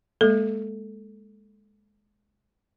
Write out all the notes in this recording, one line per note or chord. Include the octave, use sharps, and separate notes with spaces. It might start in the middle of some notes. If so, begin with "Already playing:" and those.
G#3 A#3 A4